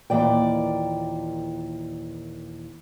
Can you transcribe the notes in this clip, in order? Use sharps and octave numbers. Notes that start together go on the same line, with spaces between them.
D#2 A#2 E3 D5 G5